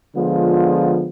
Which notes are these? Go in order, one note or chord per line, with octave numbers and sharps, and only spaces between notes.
D3 F3 G#3 B3 F4